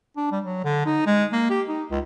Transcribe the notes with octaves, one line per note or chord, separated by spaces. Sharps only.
D4
G3
F#3
D3
D#4
G#3
A#3
G4
D#4
C#2